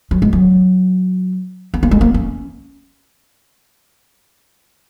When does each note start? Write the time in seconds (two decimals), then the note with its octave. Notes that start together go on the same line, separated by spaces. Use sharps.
0.11 F#3
0.22 G#3
0.33 F#3
1.74 B3
1.83 A#3
1.91 G#3
2.01 A#3
2.14 C#4